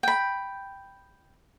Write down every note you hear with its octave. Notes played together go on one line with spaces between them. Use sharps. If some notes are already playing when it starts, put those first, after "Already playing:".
G5 B5